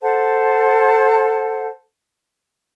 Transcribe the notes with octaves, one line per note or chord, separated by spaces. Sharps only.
A4 C5 F#5 A5